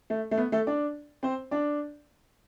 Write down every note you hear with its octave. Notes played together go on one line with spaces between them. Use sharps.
A3
A3
B3
A3 A4
D4 D5
C4 C5
D4 D5